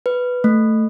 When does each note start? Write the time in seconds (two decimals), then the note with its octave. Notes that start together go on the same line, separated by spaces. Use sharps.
0.06 B4
0.44 A3